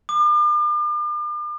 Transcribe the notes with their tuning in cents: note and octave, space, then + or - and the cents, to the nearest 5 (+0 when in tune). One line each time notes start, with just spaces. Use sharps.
D6 +40